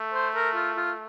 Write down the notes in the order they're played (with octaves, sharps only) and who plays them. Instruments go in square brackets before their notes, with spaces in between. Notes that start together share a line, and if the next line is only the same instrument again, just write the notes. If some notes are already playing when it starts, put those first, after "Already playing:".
Already playing: [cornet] A3
[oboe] C5
A#4
F4
F4